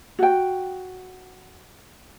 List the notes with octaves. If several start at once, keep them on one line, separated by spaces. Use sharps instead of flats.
F#4 G5